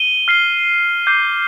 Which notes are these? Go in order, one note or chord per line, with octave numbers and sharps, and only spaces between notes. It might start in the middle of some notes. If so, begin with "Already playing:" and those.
Already playing: D#7 G7
F6 C7 G7
D6 G6 C7